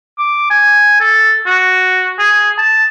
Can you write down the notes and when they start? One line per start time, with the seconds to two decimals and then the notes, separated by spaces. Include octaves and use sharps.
0.18 D6
0.50 G#5
1.01 A4
1.46 F#4
2.19 G#4
2.58 A5